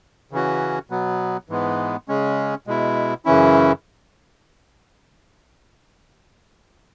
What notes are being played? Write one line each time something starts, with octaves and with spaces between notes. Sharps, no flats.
C#3 E3 C#4 F#4
B2 F#3 B3
G#2 E3 G#3 B3
C#3 G#3 C#4
B2 G#3 E4
F#2 C#3 E3 C#4 E4